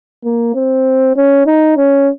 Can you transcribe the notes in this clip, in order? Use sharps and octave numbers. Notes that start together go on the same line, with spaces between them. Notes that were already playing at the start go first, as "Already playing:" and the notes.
A#3
C4
C#4
D#4
C#4